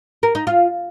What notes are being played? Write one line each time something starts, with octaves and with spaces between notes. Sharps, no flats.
A#4
D#4
F4